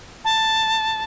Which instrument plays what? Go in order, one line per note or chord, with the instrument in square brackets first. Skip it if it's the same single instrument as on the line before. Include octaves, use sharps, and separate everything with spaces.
[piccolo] A5